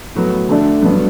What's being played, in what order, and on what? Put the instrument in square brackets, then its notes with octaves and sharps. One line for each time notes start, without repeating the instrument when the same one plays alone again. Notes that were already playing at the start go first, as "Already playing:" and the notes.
[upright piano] A2 F#3 B3
D3 A3 D4 A4 D5
G2 F#3 B3 D4